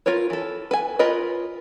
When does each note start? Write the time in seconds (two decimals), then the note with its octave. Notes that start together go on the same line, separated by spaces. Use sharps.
0.06 F4 A#4 B4 C#5
0.30 E3 A4
0.71 B4 G#5
0.99 F4 A#4 B4 C#5 D#5